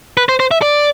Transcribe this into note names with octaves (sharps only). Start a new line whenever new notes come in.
B4
C5
C5
E5
D5